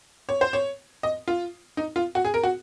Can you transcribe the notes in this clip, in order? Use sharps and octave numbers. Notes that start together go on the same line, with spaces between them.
C#5
C5
C#5
D#5
F4
D#4
F4
F#4
G#4
A#4
F#4